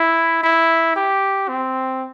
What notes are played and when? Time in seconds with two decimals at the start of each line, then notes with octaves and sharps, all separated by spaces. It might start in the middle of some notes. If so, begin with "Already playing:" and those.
Already playing: E4
0.43 E4
0.96 G4
1.48 C4